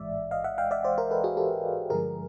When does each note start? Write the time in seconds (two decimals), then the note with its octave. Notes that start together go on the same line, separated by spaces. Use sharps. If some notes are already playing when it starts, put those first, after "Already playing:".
Already playing: A1 G#2 E3 G#3 D5 E5
0.31 D#5 F5
0.44 E5 F#5
0.58 F5 G5
0.71 D5 E5
0.84 C5 D5
0.98 A#4 C5
1.11 A4 B4
1.24 F#4 G#4
1.37 G4 A4
1.90 G2 D3 F3 G#3 G#4 A#4